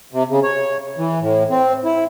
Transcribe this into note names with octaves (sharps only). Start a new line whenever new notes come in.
C3
C#3
C#5
E3
A2
C4
E4